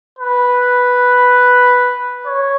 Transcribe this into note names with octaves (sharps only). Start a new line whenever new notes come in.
B4
C#5